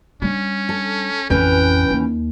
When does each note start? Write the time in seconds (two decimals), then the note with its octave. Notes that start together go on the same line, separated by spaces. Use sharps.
0.22 G3 C#4 D4
0.69 A4
1.30 A1 F2 E3 C#4 B4 G5
1.90 D#2